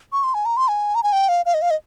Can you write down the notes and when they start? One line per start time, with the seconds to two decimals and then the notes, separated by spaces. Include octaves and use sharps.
0.12 C#6
0.24 C6
0.34 G#5
0.45 A#5
0.57 C6
0.68 G#5
0.95 A#5
1.03 G#5
1.13 G5
1.29 F5
1.46 F5
1.54 D#5
1.62 F5
1.71 D#5